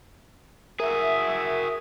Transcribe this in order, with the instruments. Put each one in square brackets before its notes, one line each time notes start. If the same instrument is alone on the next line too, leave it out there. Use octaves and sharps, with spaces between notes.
[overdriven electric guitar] F#4 G#4 [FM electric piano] A#4 [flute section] E5